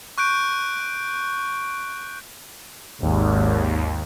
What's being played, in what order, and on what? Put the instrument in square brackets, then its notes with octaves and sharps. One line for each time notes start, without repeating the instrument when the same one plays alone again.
[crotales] C#6 F#6 G6 D7
[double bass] G#1 [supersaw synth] D#2